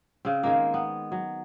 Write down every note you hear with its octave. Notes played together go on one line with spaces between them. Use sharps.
C#3 C4
D#3 G#3 A#3
B3
F#3